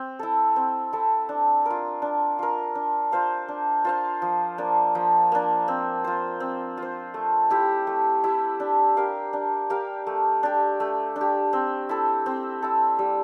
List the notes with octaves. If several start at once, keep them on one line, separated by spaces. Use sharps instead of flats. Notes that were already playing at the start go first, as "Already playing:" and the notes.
Already playing: C4
E4 A4
C4
E4 A4
D4
F4 A#4
D4
F4 A#4
D4
F4 C5 F5
D4
F4 C5 F5
F3
A#3 D4
F3
A#3 D4
C4
F4 C5
C4
F4 C5
A3
E4 G4
A3
E4 G4
D4
G4 A#4 F5
D4
G4 A#4 F5
A3
D4 G4
A3
D4
G4
C4
E4 A4
C4
E4 A4
G3